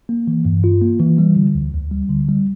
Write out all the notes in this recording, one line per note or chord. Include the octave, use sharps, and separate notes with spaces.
A#3
E3
G2
F4
A#3
E3
G3
D3
D2
D2
G3
D3
G3